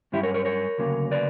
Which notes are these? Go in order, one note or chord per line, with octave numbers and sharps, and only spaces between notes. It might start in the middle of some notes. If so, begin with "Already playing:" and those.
G2 F#3 C#4 E4 G4
A#4 C#5
A#4 C#5
A#4 C#5
D2 C#3 F#3 A#3
B4 D5